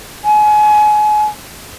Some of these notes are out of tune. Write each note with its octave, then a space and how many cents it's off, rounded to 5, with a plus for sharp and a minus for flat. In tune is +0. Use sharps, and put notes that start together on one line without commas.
G#5 +30